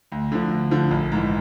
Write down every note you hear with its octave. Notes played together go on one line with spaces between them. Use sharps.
D2
D3 F3
D2
D3 F3
A#1
G#2 E3